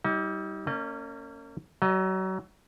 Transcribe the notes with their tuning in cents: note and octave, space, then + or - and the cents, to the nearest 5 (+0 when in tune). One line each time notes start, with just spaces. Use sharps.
G3 -20 D#4 +40
A#3 -35 C#4 +0 D#5 -35
F#3 +30 D#5 +0